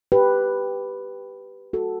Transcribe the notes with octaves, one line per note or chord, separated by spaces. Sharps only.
G4 B4
F#4 A4